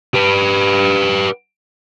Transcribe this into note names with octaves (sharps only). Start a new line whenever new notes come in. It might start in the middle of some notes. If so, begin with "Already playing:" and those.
G4 B4